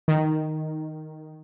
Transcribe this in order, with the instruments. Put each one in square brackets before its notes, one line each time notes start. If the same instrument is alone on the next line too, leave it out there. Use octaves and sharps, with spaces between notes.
[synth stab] D#3